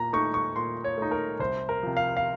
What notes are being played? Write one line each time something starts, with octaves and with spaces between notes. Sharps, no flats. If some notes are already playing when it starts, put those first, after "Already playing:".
Already playing: A#2 A#5
A3 D#4 C#6
C#6
A#2 C6
C#5
A3 D#4
A#4
C2 C5
A#4
C3 F3
F5
F5